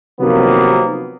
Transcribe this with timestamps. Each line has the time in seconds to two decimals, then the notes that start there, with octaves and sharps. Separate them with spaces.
0.21 C3 D#3 F3 F#3 A#3 B3